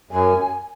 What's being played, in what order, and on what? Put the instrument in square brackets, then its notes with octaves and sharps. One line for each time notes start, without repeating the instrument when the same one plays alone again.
[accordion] F#2 [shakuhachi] G#5